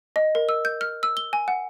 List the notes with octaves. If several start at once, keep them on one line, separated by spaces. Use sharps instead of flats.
D#5
A#4
E6
G6
F6
E6
G7
G#5
F#5